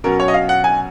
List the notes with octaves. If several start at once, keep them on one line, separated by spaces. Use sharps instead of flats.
B2 F#3 C#4 A#4
C#5
D#5
F5
F#5
G#5